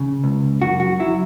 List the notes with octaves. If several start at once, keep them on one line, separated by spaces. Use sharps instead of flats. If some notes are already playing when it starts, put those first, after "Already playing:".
Already playing: C#3
C#2
F#2 F#4
F#4
F#3 E4